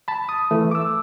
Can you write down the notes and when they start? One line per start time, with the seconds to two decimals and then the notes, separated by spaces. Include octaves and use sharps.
0.08 A5 B5
0.29 D#6
0.51 E3 A3
0.71 D6 E6